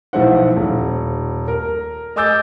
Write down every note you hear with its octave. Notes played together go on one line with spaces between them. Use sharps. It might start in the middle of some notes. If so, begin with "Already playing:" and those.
B1 F3 D#4 E4 C5 F#5
D#1
A#4
D#5 G#5 D6 E6 G6 A6